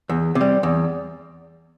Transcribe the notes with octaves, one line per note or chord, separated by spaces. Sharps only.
E2
C3
G3
E2